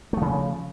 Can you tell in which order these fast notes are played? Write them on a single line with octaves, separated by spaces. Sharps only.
A3 F3 C#3